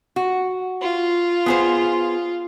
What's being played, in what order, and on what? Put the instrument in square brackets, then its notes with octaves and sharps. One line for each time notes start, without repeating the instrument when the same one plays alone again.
[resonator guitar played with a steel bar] F#4
[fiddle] F4
[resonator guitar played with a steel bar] B3 G#4 C5